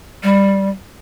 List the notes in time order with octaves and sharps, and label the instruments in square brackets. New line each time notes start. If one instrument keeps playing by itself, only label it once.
[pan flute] G3